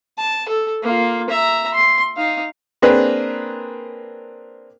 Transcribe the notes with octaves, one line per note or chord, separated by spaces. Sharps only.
A5
A4
A#3 F4
E5 A#5
C6
D#4 F5
A#3 C4 D4 G#4 A#4 B4